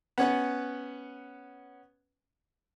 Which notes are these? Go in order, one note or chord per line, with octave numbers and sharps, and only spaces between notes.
B3 C#4 B4